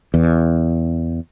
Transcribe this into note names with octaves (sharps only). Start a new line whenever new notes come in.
E2